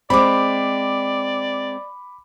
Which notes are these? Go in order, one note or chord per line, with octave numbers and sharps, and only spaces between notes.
G#3 C4 D5 B5 D6